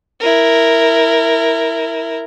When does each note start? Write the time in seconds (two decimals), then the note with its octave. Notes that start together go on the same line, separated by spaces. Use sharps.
0.20 E4 A#4